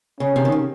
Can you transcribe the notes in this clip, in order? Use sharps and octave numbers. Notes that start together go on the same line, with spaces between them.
C#3 C#4
C3
D#3
C#3